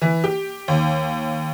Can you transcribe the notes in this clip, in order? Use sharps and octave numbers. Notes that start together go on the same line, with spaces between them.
E3
G4
D#2